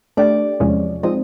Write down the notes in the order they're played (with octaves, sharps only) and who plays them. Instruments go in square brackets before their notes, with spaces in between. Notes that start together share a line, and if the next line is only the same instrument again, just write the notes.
[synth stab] A3 D4 G4 [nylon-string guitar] D5
[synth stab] E2 C3 F3 G#3 C#4
[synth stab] F3 G#3 C4 D#4 [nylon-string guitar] D#5